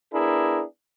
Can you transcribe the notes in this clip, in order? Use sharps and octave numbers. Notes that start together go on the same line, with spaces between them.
B3 D4 E4 G#4 A#4